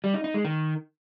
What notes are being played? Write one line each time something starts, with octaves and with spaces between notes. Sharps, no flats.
G3
D#4
D#4
G#3
D#3